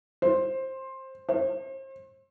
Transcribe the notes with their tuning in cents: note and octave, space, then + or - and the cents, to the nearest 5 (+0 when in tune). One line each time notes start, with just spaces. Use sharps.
C5 +15
C5 +40